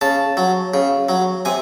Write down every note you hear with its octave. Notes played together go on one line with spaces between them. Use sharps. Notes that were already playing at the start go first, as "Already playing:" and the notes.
C#3 A5
F#3
C#3
F#3
C3 G#5